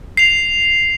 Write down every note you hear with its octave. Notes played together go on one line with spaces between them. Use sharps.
C7 F7